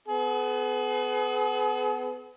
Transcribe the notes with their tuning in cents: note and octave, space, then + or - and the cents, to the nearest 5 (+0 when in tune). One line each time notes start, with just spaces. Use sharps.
B3 +25 G#4 +45